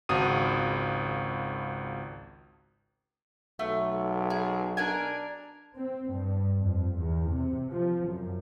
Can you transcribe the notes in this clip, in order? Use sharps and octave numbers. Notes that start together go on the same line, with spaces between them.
G#1 C#2 F#4 D#6 D#7
B1 A3
G#4
D4 A#4 G#5
C4
G2
F2
E2
C3
F3
F#2